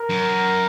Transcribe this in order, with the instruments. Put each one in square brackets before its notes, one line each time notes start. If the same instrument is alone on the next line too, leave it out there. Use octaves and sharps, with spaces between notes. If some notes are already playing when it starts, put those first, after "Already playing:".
Already playing: [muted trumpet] A#4
[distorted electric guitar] F#2